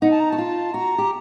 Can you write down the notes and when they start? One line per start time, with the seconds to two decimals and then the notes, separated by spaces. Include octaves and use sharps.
0.02 D#4 F#5
0.11 A5
0.20 A#5
0.30 F#4 A5
0.38 F4
0.73 F#4 A#5
0.98 G4